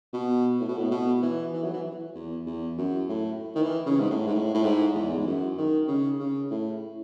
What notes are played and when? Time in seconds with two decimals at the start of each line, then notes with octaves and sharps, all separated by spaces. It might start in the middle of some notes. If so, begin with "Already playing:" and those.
0.13 B2
0.60 A2
0.68 B2
0.78 A2
0.91 B2
1.22 E3
1.53 E3
1.64 F#3
1.73 E3
2.15 E2
2.46 E2
2.78 F#2
3.09 A2
3.55 D#3
3.62 E3
3.86 C#3
4.00 G#2
4.10 A2
4.27 G#2
4.33 A2
4.54 A2
4.64 G#2
4.95 E2
5.18 G#2
5.27 F#2
5.58 D#3
5.88 C#3
6.20 C#3
6.51 A2